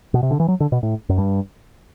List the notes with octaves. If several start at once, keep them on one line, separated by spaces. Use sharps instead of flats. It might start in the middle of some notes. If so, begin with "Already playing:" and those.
B2
C3
D3
E3
F#3
D3
B2
A2
F#2
G2